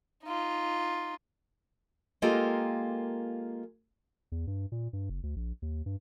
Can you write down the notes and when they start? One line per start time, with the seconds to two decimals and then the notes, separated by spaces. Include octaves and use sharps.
0.24 D#4 F4
2.22 G#3 A#3 F4 G4 A4 A#4
4.32 E2
4.47 G2
4.72 A#2
4.93 G2
5.10 F#1
5.23 D2
5.36 A#1
5.62 D#2
5.86 G2